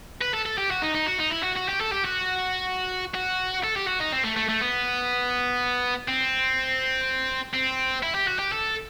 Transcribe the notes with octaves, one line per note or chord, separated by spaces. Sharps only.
B4
A4
A4
G4
F#4
D#4
D#4
F#4
D#4
E4
F#4
F#4
G4
A4
G4
F#4
F#4
A4
G4
F#4
D#4
C4
A3
A3
A3
B3
C4
C4
E4
G4
F#4
G4
A4